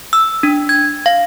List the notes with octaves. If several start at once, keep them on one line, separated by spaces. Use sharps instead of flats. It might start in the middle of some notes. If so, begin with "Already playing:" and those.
E6
D4
G#6
F5